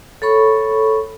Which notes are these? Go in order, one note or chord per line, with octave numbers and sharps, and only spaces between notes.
A4 C#5 B5 C#6